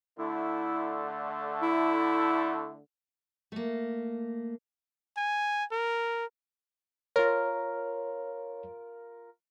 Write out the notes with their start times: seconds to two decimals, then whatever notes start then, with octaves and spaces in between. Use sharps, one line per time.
0.19 D3 A3 E4
1.62 E4
3.52 A3 A#3
5.17 G#5
5.72 A#4
7.16 F4 A#4 C#5